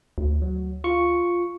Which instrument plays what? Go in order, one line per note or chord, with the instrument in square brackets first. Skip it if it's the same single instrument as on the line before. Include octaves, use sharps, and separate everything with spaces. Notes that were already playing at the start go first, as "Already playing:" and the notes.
[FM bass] D2
[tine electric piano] F#3
F4 C#6 C#7